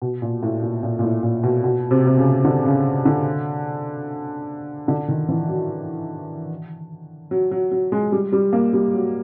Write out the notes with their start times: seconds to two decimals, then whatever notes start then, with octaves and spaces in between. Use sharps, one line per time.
0.02 B2
0.22 A#2
0.43 A2
0.62 A#2
0.83 A#2
0.99 A#2
1.03 A2
1.23 A#2
1.43 B2
1.64 B2
1.91 C3
2.07 C3
2.18 C#3
2.45 D3
2.65 C#3
3.05 D3
4.88 D3
5.08 D#3
5.29 E3
5.49 F#3
7.31 F#3
7.51 F#3
7.71 F#3
7.92 G#3
8.12 G3
8.32 G3
8.53 A#3
8.73 G3
8.94 F#3